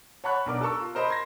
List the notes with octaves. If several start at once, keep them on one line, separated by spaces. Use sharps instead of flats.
C#5 F#5 A5 B5 C#6 F#6
B1 B3 D4 A#4 D6
A4 A#4 A5 C#6 E6
F4
A#4 C5 D#5 A#5 B5
C6 G#6 A#6